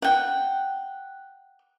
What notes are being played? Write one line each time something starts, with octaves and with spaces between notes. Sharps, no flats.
F#5 G5